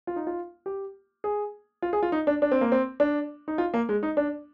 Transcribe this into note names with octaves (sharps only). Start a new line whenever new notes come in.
F4
D#4
F4
G4
G#4
F4
G#4
F4
D#4
D4
D4
C4
A#3
C4
D4
D#4
F4
A#3
G#3
D#4
D4